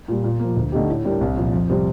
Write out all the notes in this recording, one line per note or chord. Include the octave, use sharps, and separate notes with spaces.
A#2 G3
A#2
F3 A#3
D2
D3 A3 D#4 G4
A2
G3 D4 G4 A#4
C2
A#2 F3
F2
C3 G3 C4